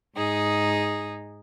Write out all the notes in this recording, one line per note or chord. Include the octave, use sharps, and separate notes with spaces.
G#2 D#4 G#4